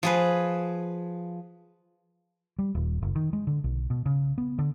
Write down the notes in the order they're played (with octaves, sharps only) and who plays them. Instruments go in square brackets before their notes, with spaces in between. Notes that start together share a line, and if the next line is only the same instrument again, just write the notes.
[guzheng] F3 G#4 B4
[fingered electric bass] G3
D#1
F#1
D#3
G#3
D3
B1
B2
C#3
B3
D3